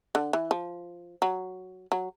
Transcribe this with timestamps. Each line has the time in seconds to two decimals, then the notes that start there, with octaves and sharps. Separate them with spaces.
0.15 D3
0.33 E3
0.51 F3
1.22 F#3
1.92 F#3